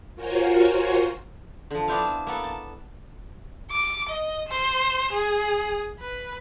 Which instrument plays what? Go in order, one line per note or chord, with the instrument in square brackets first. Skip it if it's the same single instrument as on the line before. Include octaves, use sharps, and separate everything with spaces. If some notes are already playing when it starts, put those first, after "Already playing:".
[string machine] F4 F#4 A#4 C5 C#5 G#5
[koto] D3 F3
B3 D4 E4 C5 E5 F5
A#3 B3 A4
A5
[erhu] D6
D#5
C5
G#4
B4